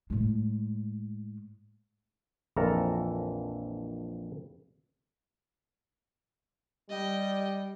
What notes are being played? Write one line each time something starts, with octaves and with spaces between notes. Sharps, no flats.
A2 G#3
A#1 F2 E3 A4 A#4 A#5
G3 D#5 G5